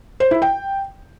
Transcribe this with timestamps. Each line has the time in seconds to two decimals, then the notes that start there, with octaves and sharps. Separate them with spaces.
0.20 C5
0.31 E4
0.42 G5